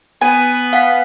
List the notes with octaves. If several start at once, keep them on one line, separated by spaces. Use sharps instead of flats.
B3 G#5
F5 F#5 B6